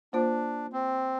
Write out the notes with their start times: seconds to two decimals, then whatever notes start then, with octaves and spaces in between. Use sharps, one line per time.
0.13 A#3 D4 F4 C5
0.73 C4